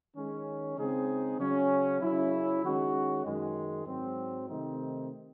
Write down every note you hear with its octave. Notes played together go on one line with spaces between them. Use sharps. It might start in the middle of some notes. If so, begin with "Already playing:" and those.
D#3 G#3 C#4
C#3 G#3 C4 D#4 G#4
C#3 F#3 C#4
C#3 F#3 C#4 E4
D#3 G#3 C#4 F#4
F#2 D#3 G#3
G#2 F#3 C4
C3 D#3 A3 C4 D#4